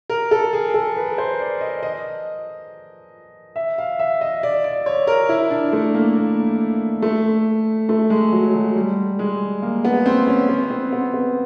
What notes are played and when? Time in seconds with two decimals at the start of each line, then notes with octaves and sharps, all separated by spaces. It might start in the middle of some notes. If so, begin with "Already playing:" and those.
0.10 A#4
0.31 A4
0.53 G#4
0.74 A4
0.96 B4
1.18 C5
1.40 D5
1.61 D#5
1.83 D#5
3.56 E5
3.78 F5
3.99 E5
4.21 D#5
4.43 D5
4.64 D5
4.86 C#5
5.07 A#4
5.29 E4
5.50 D4
5.73 A3
5.94 A#3
6.16 A#3
7.02 A3
7.89 A3
8.10 G#3
8.32 F#3
8.54 F#3
8.76 G3
9.19 G#3
9.62 A#3
9.85 B3
10.06 C4
10.27 C#4
10.49 B3
10.70 C4
10.92 B3
11.14 B3